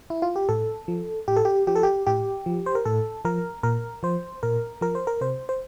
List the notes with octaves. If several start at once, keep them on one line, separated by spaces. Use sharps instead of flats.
E4
F4
G4
A2 A4
F3
A2 G4
A4
G4
F3 G4
A4
G4
A2 G4
F3
C5
A#4
A2 A4
F3 A#4
A#2 A#4
F3 C5
A#2 A#4
F3 A#4
C5
A#4
C3 C5
C5